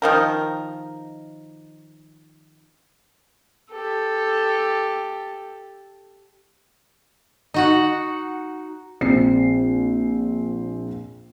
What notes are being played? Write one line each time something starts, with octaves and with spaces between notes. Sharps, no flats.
D#3 F3 A#4
G4 A4
D#4 F#4 F#5
A#1 C4 C7